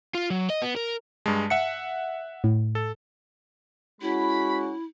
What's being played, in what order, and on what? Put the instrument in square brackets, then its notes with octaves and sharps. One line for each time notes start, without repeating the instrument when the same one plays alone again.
[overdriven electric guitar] F4
F#3
D#5
B3
A#4
[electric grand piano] G2 G#3 [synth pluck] A5
[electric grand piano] E5 F#5 C#7
[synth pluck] A2
[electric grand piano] A4
[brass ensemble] G#3 C#4 F#4 [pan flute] E4 [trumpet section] B5